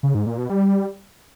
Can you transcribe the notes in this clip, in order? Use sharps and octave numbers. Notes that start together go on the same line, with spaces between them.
C#3
G#2
A#2
B2
G3